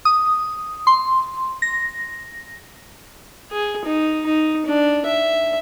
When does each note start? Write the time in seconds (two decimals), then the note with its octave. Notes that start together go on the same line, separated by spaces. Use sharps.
0.05 D#6
0.87 C6
1.62 A#6
3.51 G#4
3.85 D#4
4.26 D#4
4.66 D4
5.06 E5